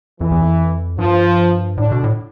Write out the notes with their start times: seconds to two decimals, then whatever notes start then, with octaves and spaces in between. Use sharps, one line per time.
0.20 F2 E3
0.31 E2
0.42 F2
0.98 G2 F3
1.77 A2 D3 D4
1.92 B2
2.04 A2